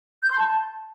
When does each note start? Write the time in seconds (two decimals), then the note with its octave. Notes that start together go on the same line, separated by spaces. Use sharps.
0.23 G6
0.30 C6
0.37 A5